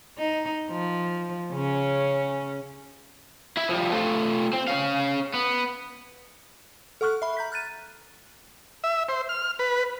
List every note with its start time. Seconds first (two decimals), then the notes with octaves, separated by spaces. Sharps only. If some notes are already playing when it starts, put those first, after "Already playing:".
0.18 D#4
0.70 F3
1.53 C#3 C#4
3.57 E4 E5
3.69 F3 G3
3.92 A3 F4
4.53 C4
4.68 C#4 F5
5.34 B3
7.01 A4 F#5 C#6 F6 F#6
7.22 E5 B5
7.37 A#5 G6 B6
7.52 F6 F#6 A6 D#7
8.84 E5
9.09 C5
9.29 F6
9.59 B4